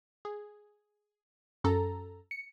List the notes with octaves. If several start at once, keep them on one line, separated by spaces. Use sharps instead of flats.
G#4
F#2 A4 A#5
C#7